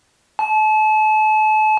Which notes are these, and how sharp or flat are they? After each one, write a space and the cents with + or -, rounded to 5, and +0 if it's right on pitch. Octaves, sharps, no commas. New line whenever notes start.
A5 -35